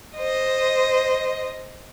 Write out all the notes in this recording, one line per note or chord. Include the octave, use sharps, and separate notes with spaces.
C5 D#5